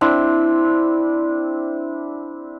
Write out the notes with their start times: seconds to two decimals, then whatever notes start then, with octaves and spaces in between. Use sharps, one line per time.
0.01 C4 D4 E4